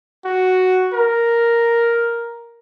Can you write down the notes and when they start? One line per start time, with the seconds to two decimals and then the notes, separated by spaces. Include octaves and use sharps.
0.25 F#4
0.93 A#4